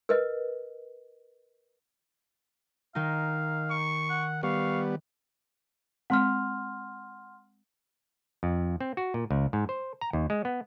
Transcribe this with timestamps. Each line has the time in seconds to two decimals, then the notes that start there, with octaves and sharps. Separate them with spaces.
0.09 A#4 B4 D#5
2.95 D#3 D#4 F5
3.70 C#6
4.10 F#5
4.43 G3 B3 F5 C#6
6.10 G#3 C4 F#5 C6 F6
8.43 F2
8.80 C4
8.97 F#4
9.14 A#2
9.31 C#2
9.53 G#2
9.69 C5
10.01 A#5
10.13 D#2
10.30 G#3
10.45 B3